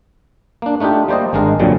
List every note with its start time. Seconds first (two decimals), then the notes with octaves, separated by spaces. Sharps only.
0.62 A#3 D4
0.80 A3 D4 D#4 F4 G4
1.08 G3 A#3 C5 D5 D#5
1.33 G#1 G#3 D4 A#4
1.59 F2 A#2 D3 F#3 G3